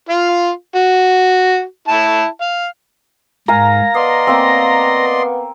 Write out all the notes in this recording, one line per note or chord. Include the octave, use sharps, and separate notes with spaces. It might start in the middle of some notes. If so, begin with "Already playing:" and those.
F4 F5
F#4
E4 A5
F5
G#2 A#4 F5 G#5 A#5
B3 D5 D#5 C6
A#3 C4